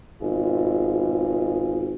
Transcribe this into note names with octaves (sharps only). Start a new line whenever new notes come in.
G#1 B2 F4 G#4